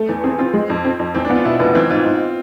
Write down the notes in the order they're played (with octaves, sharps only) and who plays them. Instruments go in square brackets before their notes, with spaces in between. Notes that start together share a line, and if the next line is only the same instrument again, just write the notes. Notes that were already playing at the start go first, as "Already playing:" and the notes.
Already playing: [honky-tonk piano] A3
E2
[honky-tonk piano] C4 [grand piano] G#4
[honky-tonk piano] C4 [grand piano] F4
[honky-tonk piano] G#3
F2
C4
F2
[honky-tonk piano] E2 [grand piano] C4
[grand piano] D4
[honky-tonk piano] B3
[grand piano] F4
[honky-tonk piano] B2 [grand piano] E4
[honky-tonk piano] F1 [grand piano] B3
[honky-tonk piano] E3 [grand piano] C4
[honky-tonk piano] G#2 [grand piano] F4
[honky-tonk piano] G#2